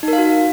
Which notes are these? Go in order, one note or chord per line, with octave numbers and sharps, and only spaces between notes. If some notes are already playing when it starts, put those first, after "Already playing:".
D#4
A#4
F5
F#4